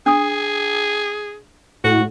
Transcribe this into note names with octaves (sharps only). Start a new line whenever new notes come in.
D4 G#4 D#6
A2 F#4